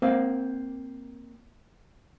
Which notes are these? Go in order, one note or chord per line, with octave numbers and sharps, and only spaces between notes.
A#3 C4 F5